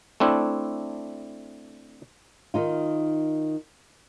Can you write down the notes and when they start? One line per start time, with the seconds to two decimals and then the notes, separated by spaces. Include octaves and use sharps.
0.20 A3 C4 D4 E4
2.54 D#3 D#4 F4